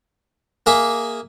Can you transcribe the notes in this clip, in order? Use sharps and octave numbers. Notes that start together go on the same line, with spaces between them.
A#3 G#4 E5